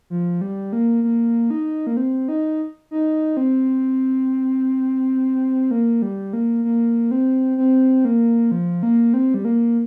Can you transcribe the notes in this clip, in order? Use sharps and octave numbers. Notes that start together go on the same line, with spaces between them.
F3
G3
A#3
A#3
D#4
A#3
C4
D#4
D#4
C4
A#3
G3
A#3
A#3
C4
C4
A#3
F3
A#3
C4
G3
A#3